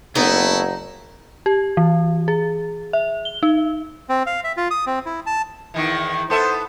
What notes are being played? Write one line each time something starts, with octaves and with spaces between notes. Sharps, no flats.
F#1 A3 B3 D#4 E4
G4
E3
G#4
E5
G7
D#4
C4
F5
E5
F4
D#6
C4
E4
A5
E2 D#3 E3
B3 A4 C5 E5